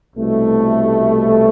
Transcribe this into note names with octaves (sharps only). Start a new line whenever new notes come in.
C2 B2 A3